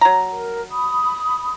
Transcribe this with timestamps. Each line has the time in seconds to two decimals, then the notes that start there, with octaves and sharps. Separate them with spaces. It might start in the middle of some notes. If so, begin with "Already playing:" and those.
0.01 F#3 A#5
0.33 A#4
0.72 B5 D#6